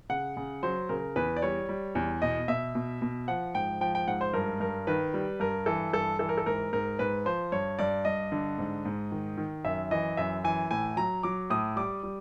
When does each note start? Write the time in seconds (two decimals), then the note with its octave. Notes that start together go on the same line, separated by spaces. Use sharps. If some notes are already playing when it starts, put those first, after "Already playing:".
0.09 C#3 F#5
0.37 C#3
0.63 F#3 C5
0.89 C#3 A#4
1.16 E2 B4
1.37 D5
1.42 G3 C#5
1.69 G3
1.95 E2
2.22 B2 D#5
2.48 B2 E5
2.75 B2
3.02 B2
3.28 F3 F#5
3.55 G#2 G5
3.81 F3 G5
3.95 G5
4.07 G#2 F#5
4.21 C5
4.33 G2 A#4
4.60 G2 A#4
4.87 D#3 B4
5.14 G3
5.40 G2 A#4
5.66 E3 A4
5.93 G2 A4
6.19 E3 A4
6.29 A#4
6.37 A4
6.46 G#2 A#4
6.73 G#2 A#4
6.99 G#2 B4
7.25 F3 C5
7.52 G2 C#5
7.79 G2 D5
8.05 G2 D#5
8.32 D3
8.58 G#2
8.85 G#2
9.11 D#3
9.37 D#3
9.65 F#2 E5
9.91 E3 D#5
10.17 F#2 E5
10.44 E3 G#5
10.71 A2 G#5
10.97 F#3 A#5
11.23 F#3 D6
11.50 A2 D#6
11.76 G3 D6
12.03 G3